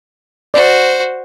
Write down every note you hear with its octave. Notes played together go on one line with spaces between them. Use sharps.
F#4 C5 D5